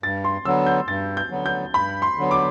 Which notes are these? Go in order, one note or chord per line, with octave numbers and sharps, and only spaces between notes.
G2 A6
C6
D3 F#3 B3 E6
G6
G2 A6
G6
D3 F#3 B3
G6
G2 B5
C6
D3 F#3 B3
D6